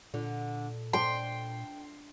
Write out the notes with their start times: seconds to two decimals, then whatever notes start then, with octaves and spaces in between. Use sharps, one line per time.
0.14 A#2 D3
0.93 D4 G5 C6